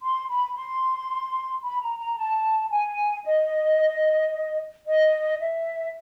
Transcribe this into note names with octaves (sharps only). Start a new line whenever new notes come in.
C6
B5
C6
B5
A#5
A#5
A5
G#5
D#5
D#5
E5